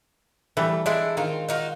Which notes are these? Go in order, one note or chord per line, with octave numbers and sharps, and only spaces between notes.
E3 G3 A3
G#3 D4 E4 A4
D#3 C4 F4
D#4 F4 F#4